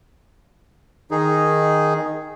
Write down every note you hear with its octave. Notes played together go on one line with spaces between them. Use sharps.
D#3 D#4 G#4